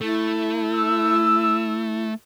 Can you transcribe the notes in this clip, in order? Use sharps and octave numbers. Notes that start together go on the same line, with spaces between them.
A3 E4
E6